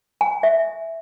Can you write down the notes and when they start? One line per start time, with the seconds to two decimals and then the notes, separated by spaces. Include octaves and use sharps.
0.21 G#5
0.43 E5